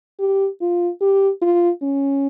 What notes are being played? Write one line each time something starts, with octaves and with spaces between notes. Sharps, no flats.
G4
F4
G4
F4
C#4